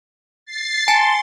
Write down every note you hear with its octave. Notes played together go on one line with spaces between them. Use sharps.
A6 C7
G#5 A5 C6 C#7